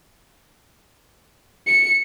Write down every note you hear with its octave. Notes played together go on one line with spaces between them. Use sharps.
C#7